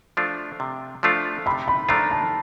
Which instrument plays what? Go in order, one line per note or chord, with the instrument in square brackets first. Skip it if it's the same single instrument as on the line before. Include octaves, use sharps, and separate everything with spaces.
[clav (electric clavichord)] F3 A3 D4 F4
C3
F3 A3 D4 F4
[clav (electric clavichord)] C3 [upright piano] B5
[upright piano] B5
[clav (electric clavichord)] F3 A3 D4 F4 [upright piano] A#5
[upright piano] A5